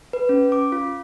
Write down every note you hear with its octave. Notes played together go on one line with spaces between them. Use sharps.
B4
C#4
D6
F4